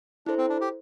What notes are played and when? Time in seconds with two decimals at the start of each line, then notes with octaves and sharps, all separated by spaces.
0.26 D4 E4 A4 C5
0.38 C4
0.49 D4
0.61 G4